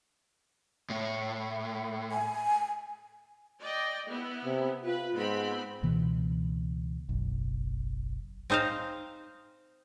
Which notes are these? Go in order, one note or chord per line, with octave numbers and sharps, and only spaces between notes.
A2
G#5
D5 D#5 G5
B3 E4
C3
F4 B4
G#2 B3 C4 B5
C#2 B2 E3 A#3
F#1 B1
C4 D#4 C5 D#5 F5